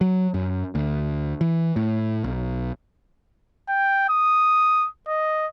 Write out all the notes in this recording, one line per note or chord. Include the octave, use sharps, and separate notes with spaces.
F#3
F#2
D2
E3
A2
B1
G5
D#6
D#5